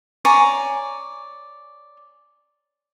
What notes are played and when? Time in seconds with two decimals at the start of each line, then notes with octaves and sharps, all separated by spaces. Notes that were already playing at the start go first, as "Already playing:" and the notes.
0.25 C#5 D5 G#5 A#5